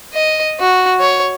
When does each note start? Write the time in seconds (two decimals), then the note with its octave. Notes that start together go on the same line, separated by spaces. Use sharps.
0.13 D#5
0.60 F#4
1.00 C#5